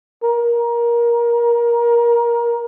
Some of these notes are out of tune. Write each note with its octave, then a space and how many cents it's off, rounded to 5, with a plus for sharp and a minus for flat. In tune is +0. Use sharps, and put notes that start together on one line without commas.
A#4 +20